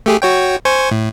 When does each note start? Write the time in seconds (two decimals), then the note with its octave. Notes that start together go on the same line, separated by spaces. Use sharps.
0.06 A3 G4 G#4
0.22 F#4 C#5 G5
0.65 C5 G#5 C#6
0.91 A2